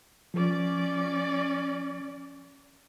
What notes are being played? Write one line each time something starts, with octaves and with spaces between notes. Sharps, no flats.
F3 C#4 D5